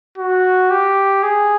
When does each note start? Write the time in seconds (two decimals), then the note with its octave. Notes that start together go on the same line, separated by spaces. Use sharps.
0.18 F#4
0.70 G4
1.23 G#4